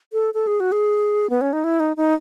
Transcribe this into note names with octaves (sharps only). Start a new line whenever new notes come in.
A4
A4
G#4
F#4
G#4
B3
C#4
D#4
E4
D#4
D#4